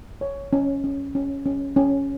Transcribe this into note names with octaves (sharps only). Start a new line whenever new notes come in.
C#5
C#4
C#4
C#4
C#4
C#4